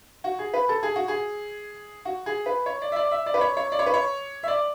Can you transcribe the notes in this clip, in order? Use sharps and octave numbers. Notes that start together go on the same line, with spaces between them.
F#4
G#4
B4
A4
G#4
F#4
G#4
F#4
G#4
B4
C#5
D5
E5
D5
E5
D5
B4
C#5
C#5
D5
C#5
B4
C#5
E5
D5